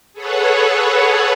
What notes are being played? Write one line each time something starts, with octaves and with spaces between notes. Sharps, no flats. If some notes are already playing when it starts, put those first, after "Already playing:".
G#4 A4 B4 C#5 F#5